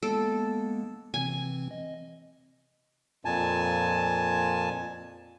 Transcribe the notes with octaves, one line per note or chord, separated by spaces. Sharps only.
G#3 A#3 B3 A4
C3 E3 C4 G#5
D#5
F2 A#2 G#5 A5